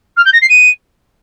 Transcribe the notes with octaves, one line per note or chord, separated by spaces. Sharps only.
F6
G6
A#6
C7
D#7